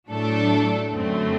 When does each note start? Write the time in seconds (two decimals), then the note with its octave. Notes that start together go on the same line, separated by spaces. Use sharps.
0.10 A2 F#3 A3 D4 A4
0.92 F#2 D3 A3 C4